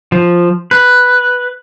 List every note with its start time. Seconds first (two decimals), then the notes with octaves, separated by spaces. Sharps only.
0.12 F3
0.71 B4